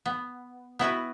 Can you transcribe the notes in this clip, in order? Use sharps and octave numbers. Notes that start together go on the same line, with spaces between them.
B3
B3 E4 F#4 B4